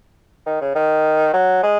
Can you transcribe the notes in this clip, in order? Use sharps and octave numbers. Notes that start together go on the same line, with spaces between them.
D#3
C#3
D#3
F#3
G#3